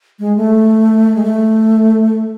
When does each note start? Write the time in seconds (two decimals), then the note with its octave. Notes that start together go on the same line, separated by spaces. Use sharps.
0.19 G#3
0.37 A3
1.15 G#3
1.23 A3